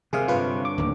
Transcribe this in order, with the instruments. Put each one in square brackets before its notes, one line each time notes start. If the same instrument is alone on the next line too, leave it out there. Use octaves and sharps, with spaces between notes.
[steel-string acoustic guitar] D#2 G#3 [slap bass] C3 [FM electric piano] G#4 F5
[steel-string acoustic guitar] G2 D3 C#5 [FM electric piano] F4 B4
[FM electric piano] D6
[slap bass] D1 D#2